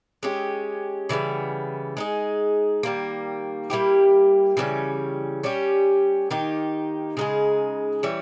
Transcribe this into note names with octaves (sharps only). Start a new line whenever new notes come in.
G#3 C#4 G4
C#3 E3 G3 B3
G#3 D#4 G#4
D#3 G3 A#3
G3 A#3 E4 G4
C#3 E3 G3 C#4
G3 C#4 G4
D#3 A#3 D#4 G4
C#3 G#3 D#4 G#4
E3 G3 C#4